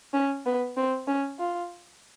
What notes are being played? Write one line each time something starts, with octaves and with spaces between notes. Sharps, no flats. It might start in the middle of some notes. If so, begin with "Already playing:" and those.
C#4
B3
C4
C#4
F4